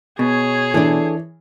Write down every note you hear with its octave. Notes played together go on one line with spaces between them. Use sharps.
B2 G#4 C#5
E3 D4 A4